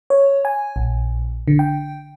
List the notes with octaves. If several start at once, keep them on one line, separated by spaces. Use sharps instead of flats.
C#5
G#5
A#1
D3
G5